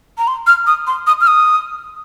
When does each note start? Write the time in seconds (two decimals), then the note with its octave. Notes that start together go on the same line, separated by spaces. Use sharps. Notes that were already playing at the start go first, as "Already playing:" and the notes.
0.18 A#5
0.27 C6
0.47 F6
0.67 D#6
0.87 C6
1.07 D#6
1.21 F6
1.27 D#6